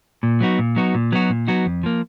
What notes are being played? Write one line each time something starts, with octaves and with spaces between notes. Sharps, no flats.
A#2
F#3 B3 D#4 F#4
A#2
F#3 B3 D#4 F#4
A#2
F#3 B3 D#4 F#4
A#2
F#3 B3 D#4 F#4
F2
F3 A#3